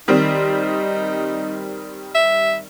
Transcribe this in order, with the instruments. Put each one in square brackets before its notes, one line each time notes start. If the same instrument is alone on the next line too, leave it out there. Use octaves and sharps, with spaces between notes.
[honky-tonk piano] D#3 G3 C4 [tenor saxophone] D#4
[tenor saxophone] E5